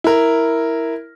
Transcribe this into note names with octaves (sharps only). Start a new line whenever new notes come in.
E4 A#4